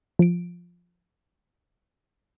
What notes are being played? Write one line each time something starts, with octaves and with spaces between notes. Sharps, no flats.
F3 D7